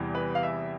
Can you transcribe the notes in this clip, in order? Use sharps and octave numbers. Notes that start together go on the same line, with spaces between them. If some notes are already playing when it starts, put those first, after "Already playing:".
Already playing: E2 C3 E3 G3
B4
F5
E5